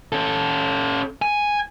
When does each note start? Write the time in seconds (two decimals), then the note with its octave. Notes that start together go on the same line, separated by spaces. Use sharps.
0.12 C#4 A4
1.22 G#5